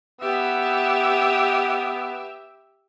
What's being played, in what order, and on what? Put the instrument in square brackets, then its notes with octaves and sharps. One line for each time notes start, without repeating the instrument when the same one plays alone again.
[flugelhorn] B3 [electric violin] G4 E5